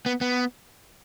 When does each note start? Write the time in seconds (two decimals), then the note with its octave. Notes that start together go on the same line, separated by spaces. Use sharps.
0.06 B3
0.21 B3